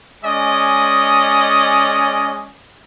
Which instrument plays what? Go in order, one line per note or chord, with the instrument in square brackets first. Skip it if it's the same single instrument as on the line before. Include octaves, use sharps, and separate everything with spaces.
[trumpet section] G#3 C#4 D5 D#5